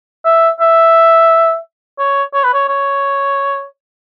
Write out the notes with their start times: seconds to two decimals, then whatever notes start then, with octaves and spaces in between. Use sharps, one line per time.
0.25 E5
0.60 E5
1.99 C#5
2.34 C#5
2.44 B4
2.54 C#5
2.68 C#5